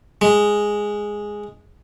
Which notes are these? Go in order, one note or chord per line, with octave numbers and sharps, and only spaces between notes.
G#3